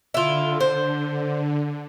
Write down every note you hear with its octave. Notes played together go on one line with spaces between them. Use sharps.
D3 E4 F4
C5